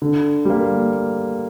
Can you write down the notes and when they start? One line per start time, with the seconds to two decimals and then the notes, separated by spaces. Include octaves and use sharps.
0.02 D3
0.45 G3 A#3